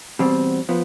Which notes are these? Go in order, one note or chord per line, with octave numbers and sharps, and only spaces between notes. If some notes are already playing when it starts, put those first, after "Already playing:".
E2 B2 G3 C4
F3 B3